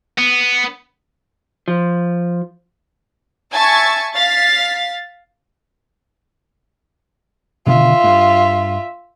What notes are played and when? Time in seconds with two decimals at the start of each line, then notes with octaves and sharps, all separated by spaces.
0.18 B3
1.68 F3
3.52 E5 G#5 A5 C#6 G#6 A6
4.15 F5 A6 B6
7.66 B2 D3 D#3 F4 E5
8.04 G2